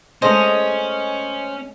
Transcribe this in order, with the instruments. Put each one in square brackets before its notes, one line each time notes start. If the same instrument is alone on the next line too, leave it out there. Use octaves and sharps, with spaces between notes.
[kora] G#3 A3 [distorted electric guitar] C#4 [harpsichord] C5 [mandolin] D#5